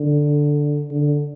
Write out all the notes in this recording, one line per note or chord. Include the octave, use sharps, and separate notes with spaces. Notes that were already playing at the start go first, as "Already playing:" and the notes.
Already playing: D3
D3